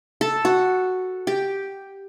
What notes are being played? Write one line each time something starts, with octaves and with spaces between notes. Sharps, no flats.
A4
F#4
G4